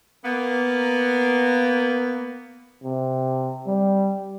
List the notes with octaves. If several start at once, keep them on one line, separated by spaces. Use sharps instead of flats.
A#3 B3
C3
G3